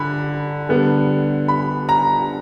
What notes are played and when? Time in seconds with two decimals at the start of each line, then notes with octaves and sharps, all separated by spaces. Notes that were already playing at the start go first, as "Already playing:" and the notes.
Already playing: D3 B5
0.69 D3 G3 B3
1.48 B5
1.89 A#5